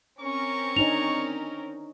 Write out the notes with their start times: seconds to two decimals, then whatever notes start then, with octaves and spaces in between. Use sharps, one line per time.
0.21 C4 C#4 A#4 C#6
0.76 D4 D#4 C#5 F7